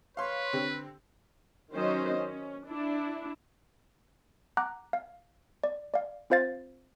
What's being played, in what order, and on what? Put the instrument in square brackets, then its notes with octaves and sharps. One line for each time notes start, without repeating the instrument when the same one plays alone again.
[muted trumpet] B4 [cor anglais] C#5 [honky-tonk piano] F5 C6
[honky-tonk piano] D3 C4 G4
[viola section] D#3 F#3 C#4 C5 D#5
C#4
D4 E4
[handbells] F#5 A#5 D6 F#6
F5
D5
D5 F5
C4 F4 C5 F5 A6